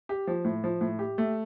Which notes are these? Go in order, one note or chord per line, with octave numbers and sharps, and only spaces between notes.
G4
F3
A2
F3
A2
G4
A3